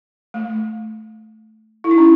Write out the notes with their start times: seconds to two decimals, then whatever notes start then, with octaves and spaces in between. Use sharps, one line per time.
0.34 A3
1.84 E4
1.91 D#4
1.98 C#4 E4